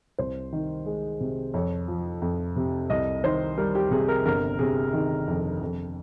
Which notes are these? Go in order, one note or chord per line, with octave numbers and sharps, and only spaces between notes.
C2 C5
D#3
G#3
C3
F2 C#5
F3
F2
C3
C2 D#5
D#3 C5
G3 A#4
G4
C3 G#4
A#4
G1 A#4
C3 G#4
D#3 G#4
F2
F2